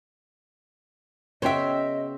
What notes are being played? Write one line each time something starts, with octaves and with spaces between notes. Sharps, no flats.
C#3 B3 F#4 C5 C#5 D#5 E5 G5